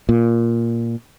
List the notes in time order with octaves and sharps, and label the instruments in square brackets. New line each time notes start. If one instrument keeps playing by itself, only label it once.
[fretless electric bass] A#2